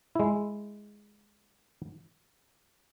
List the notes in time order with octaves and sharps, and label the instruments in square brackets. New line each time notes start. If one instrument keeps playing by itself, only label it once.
[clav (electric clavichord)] G#3 E4